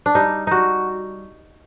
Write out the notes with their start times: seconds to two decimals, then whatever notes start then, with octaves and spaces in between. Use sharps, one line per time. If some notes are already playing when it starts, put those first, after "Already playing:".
0.06 D4
0.15 G3 D#4
0.47 G3 D#4 F#4